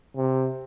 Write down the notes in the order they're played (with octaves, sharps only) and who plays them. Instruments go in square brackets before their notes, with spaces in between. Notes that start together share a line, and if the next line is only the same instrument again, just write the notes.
[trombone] C3